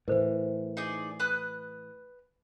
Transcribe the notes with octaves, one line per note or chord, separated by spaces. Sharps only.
A2 E3 A#4 C5
D#4 G#4 D5
B4 D#6 F#6